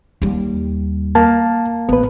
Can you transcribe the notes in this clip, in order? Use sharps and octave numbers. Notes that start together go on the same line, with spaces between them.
D#2 G3
A#3 A5
A1 B3 B4